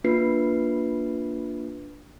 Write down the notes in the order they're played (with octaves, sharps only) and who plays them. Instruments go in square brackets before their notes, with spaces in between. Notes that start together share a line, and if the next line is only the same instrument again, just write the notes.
[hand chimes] A#3 D4 F4 B4 C7